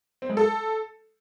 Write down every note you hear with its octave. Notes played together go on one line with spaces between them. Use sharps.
C4
G#3
A4